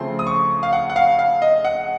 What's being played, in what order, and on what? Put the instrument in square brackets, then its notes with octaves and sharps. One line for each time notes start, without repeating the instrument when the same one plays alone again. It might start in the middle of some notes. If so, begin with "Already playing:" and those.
Already playing: [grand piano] C#3 F3 A3 C4 C6
D#6
C#6
F5
F#5
F#5
F5
F5
D#5
F#5